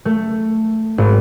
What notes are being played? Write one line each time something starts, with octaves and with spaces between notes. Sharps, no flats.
A3
G#1